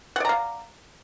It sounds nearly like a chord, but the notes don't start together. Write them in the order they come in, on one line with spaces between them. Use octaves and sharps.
F#5 D5 A#5 F5